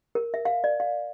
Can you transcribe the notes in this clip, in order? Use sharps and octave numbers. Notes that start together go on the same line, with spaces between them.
A#4
E5
F5
D5
F5